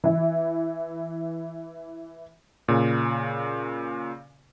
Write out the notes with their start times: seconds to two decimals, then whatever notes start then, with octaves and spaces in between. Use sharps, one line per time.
0.04 E3 E4
2.68 A#2 C#3